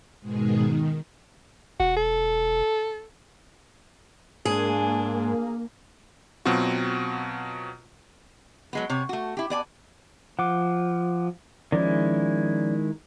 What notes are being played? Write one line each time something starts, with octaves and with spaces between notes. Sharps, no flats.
G#2 B2 D#3 G#3 G#4
D#3
E1 F#4
A4
G#2 A#3 D4 G#4 G#5
B2 F#3 C4 F4 F#4
F#3 G#3 B3
C3 C#5
A3 F#4
E4 G4
B3 D5 G#5
F3 F#5 D6
D#3 F3 G#3 C#4 E4 D5